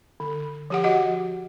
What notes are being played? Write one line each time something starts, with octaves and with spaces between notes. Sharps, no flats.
D3
F3 G4 F#5
F#4 D#5 F#5